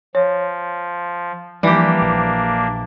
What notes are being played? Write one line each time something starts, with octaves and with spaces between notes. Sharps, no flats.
F3 C#5
E3 F3 G3 A#3 D4 G4
A#1